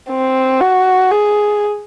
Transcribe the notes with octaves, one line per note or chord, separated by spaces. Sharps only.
C4
F#4
G#4